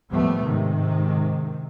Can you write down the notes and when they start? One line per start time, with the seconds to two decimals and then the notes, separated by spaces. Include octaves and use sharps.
0.12 D#2 A2 F3 G3 A3 B3
0.42 G#2 C3 D#3